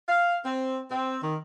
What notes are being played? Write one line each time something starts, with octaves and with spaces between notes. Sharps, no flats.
F5
C4
C4
D#3